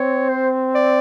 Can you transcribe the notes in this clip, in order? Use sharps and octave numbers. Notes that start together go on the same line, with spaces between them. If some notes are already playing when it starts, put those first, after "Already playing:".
Already playing: C4 C#5
C5
D5